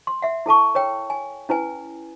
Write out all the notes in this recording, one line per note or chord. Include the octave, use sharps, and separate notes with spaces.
C6
E5 F#5
E4 A4 A5 C#6
A#4 C#5 G5
G#5
C#4 E4 B4 G#5